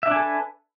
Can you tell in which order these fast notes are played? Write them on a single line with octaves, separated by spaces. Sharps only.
E5 D4 G#5 A4 B4